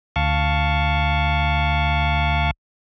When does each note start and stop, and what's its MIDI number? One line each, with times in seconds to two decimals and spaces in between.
0.16 2.51 38
0.16 2.51 77
0.16 2.51 81
0.16 2.51 85